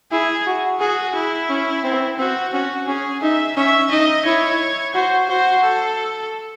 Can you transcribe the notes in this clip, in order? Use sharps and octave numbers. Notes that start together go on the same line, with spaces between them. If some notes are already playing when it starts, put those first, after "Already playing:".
E4 G#4
F#4
F#4 G#4
E4
C#4
C4
C4 F#4
C#4 F#4
C#4 G#4
D#4 E5
C#4 E5
D#4 D#5
E4 C#5
F#4 C5
F#4 C5
A4